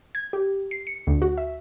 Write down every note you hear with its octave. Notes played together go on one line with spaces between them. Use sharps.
G#6
G4
C7
C#7
D2
F#4
E5